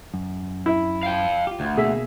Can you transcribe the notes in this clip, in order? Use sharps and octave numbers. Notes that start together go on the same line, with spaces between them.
F#2
E4
F5 G5
F4 G4
D2
B2 A#3 G#4 E5